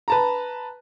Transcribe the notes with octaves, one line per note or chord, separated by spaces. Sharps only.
B4 A5 A#5